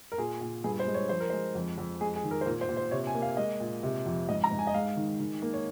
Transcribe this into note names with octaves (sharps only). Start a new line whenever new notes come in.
A#4
A#2 G#4
A#2
G2 G#4
C5
G#3
C#5
F3 C5
A#4
G#3 C5
F2
F2
G#3 G#4
G#4
D#3
A#4
C5
A#2 A#4
C5
A#2
C5
C3 C#5
G#5
A#3
F5
G#3 D#5
A#2
C3
F2
G#2 D#5
A#5
G#2
G#5
D#5
G#3 F5
D#3
D#3
A#3
C#5